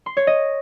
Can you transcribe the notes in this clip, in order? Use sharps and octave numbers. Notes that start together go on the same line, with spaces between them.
C6
C#5
D#5